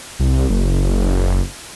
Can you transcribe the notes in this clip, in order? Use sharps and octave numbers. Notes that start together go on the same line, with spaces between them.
C2
F#1